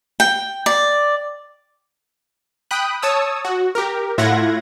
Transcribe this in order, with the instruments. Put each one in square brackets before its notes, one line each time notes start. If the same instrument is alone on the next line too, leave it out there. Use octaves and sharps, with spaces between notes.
[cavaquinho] G5
D5
[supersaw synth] G5 B5 D#6 F#6
C#5 A5 D#6 E6
F#4
G4 A#4
A2 E4 F4 F#5 G#6 A#6